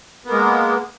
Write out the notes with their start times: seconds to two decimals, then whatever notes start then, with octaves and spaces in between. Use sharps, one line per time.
0.25 B3
0.28 A#3
0.32 G#3